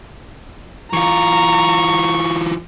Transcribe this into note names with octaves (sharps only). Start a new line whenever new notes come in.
E3 F4 A#5 C#6